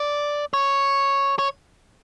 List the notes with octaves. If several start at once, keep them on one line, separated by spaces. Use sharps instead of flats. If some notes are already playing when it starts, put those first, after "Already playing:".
Already playing: D5
C#5
C#5